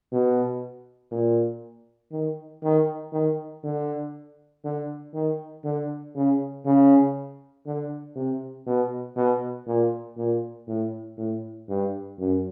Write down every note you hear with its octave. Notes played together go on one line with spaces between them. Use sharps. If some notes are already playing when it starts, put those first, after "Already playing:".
B2
A#2
D#3
D#3
D#3
D3
D3
D#3
D3
C#3
C#3
D3
C3
B2
B2
A#2
A#2
A2
A2
G2
F#2